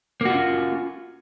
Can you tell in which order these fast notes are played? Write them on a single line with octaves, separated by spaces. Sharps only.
A#3 F#4 F4 C#4